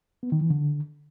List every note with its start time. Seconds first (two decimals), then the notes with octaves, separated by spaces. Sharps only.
0.23 B3
0.32 D#3
0.41 E3
0.50 D3